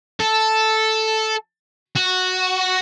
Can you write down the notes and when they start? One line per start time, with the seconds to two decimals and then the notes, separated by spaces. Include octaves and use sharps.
0.20 A4
1.96 F#4